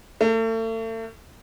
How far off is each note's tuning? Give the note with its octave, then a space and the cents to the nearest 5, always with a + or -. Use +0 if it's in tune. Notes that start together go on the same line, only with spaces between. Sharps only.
A3 +40